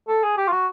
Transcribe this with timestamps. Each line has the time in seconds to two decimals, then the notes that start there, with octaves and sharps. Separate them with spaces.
0.08 A4
0.23 G#4
0.37 G4
0.48 F4
0.52 F#4